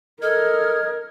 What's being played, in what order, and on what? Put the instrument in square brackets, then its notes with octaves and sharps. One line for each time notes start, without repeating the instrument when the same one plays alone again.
[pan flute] A4 [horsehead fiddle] A#4 [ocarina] D#5 [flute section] D#6 F6 G#6